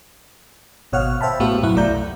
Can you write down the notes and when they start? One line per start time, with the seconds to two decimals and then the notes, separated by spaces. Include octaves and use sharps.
0.92 G#1 B2 C#5 F5 F#5 F6
1.21 C5 E5 G5 A5 B5
1.40 B1 A2 B3 F#4 G4 F5
1.63 F#2 B2 E4 F#5
1.76 B1 A3 D5 A#5 G6
1.88 C2